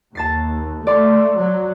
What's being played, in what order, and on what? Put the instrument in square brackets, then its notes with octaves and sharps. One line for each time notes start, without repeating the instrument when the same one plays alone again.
[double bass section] D#2 [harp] A5 A6 C7
[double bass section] A3 [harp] D5 C6
[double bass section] F#3